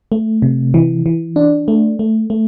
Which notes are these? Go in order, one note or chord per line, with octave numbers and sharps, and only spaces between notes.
A3
C3
E3
E3
D4
A3
A3
A3